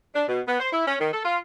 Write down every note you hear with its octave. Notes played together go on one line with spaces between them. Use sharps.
D4
B2
B3
C5
E4
C#4
D#3
A4
F4